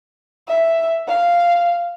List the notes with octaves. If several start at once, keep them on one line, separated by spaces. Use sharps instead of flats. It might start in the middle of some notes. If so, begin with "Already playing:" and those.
E5
F5